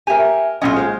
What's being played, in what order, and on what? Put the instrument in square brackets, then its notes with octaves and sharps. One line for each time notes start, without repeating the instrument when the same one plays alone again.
[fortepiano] G4 A#4 [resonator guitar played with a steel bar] E5 G#5
[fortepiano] B1 D#5 [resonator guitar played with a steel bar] C#4 F4
[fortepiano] G#3 C5